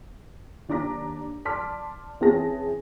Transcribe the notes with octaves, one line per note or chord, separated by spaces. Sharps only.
D#2 D4 A#5 D6 A#6 B6
D5 A5 C6 D6 F6 B6
E3 C4 C#4 G#4 A5 A#6